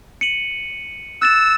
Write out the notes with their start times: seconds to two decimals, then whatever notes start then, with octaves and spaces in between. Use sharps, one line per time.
0.21 C#7 D#7 F#7
1.22 E6 F#6 A6 E7